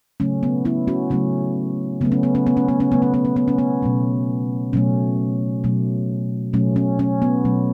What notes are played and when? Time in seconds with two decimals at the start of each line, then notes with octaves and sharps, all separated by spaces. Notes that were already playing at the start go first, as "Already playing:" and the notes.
0.20 C#3 F#3 A3 C#4
0.43 B3
0.65 B3 E4
0.88 C#4 F#4
1.10 C#3 F#3 A3 C#4
2.01 C#3 F#3 A3 B3
2.12 C#4
2.23 B3
2.35 C#4
2.47 B3
2.57 C#4
2.68 B3
2.80 C#4
2.92 C#3 F#3 A3 B3
3.02 C#4
3.14 B3
3.25 C#4
3.36 B3
3.48 C#4
3.58 B3
3.82 B2 F#3 A3
4.73 B2 F#3 A3 C#4
5.64 B2 F#3 A3
6.53 B2 F#3 A3 C#4
6.76 C#4
6.99 C#4
7.22 B3
7.45 B2 F#3 A3